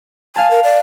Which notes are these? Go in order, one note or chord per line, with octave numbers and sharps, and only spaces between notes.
F5 G#5 A5
A#4
D5